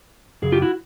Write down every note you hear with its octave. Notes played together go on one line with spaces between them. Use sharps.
F#2 C#3 G#4
F4 G4
E4 F#4